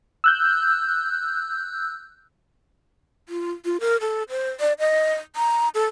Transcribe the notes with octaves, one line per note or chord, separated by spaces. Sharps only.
E6 F#6 G6
F4
F4
A#4
A4
C5
D5
D#5
A#5
A4